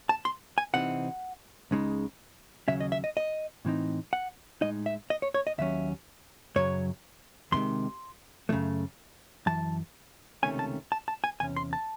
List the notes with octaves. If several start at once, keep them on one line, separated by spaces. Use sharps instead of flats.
A5
C6
G#5
C3 E3 C4 D#4 F#5
C#2 C#3 G#3 D#4
D#2 C#3 F#3 C#4 E5
D#5
E5
D#5
D#5
A2 E3 C4 D#4
F#5
A2 G#3 D#4 D#5
E5
D#5
C#5
C#5
D#5
D#2 D#3 F#3 C#4 E5
F#2 C#3 F#3 C#5
E2 C3 D#3 G#3 C6
F#2 C#3 E3 A3
F#2 E3 A5
C#2 C3 D#3 A3 C#4 G#5
A5
A5
A5
G#5
E2 C3 C#4 G#5
C6
A5